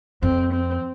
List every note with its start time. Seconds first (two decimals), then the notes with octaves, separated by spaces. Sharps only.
0.22 F2 C4
0.53 C4